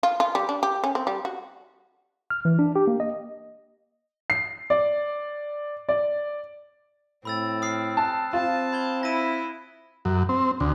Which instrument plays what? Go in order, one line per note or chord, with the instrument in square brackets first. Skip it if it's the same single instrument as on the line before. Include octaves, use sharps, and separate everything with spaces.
[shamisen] F4
F4
G3
D4
G4
C#4
C4
G3
F#4
[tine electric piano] F6
E3
D4
G4
A#3
D#5
[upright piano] C7
D5
D5
[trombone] A2 [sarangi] C4 [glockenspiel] B5 E6 A6
[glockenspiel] D#6 F6 C7
[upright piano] A5 [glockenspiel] F#6
[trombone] C4 [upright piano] F4 [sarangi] A5
[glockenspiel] B5 G#6 G7
[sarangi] E4 [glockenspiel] A#6 D#7
[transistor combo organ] F#2
C4
D2